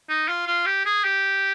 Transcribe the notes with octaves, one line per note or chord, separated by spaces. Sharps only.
D#4
F4
F4
G4
G#4
G4